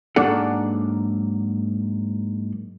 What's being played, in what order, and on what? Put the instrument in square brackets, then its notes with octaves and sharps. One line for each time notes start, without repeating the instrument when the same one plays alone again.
[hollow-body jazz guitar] G#2 F#3 A#3 D4 A4 F#5